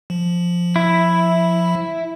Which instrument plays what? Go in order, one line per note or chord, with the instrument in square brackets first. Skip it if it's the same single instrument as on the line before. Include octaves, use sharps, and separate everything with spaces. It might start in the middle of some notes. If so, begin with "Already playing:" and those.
[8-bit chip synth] F3
[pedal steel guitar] E4